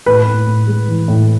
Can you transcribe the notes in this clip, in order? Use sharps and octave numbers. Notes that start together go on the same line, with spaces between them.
A2 B4
A2
A2
G#3
E3
A2